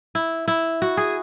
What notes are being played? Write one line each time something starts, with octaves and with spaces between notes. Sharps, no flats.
E4
E4
F#4
G#4